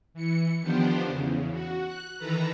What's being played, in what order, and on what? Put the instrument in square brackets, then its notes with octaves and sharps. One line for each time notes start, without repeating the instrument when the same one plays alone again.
[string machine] E3 C#7
D#3 F3 B3 D4 G4 C5
E2 C#3
F#4
F#6
D#3 E3 A4 B4 A#5